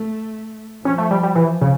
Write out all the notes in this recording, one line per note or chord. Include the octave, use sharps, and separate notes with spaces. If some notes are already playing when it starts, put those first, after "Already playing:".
Already playing: A3
F3 C#4
A3
G3
G3
E3 F3
C#3